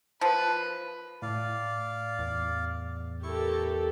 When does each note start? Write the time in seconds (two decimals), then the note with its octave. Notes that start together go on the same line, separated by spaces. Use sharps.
0.21 F3 B4
1.22 A2 D5 F5
2.19 E2
3.23 E4 G4 A4 A#4 C#6